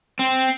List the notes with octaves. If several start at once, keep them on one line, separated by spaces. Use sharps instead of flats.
C4